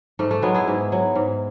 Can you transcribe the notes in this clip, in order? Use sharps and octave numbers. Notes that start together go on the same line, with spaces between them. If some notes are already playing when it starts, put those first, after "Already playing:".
G#2 A3
A3
F#3 G#3 B3
E4 G#4
G#2
F#3
G#2